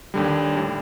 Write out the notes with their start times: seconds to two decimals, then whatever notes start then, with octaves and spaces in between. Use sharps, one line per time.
0.14 D#2 D3 G3
0.56 A2 G3